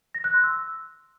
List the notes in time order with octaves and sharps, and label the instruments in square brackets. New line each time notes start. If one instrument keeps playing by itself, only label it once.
[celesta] A#6
F#6
C6
E6